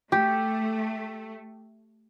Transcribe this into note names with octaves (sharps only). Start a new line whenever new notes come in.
A3 G4